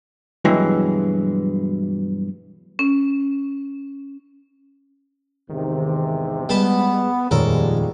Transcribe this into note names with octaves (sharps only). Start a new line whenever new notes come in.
G2 B2 E3 F#3 G#3
C#4
E2 G#2 C3 D#3
G3 G#3 B3 A5 B5
D#1 F2 A#2 G3 G#3 A4 A#4 C#5